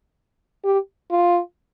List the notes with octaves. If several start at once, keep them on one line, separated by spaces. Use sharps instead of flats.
G4
F4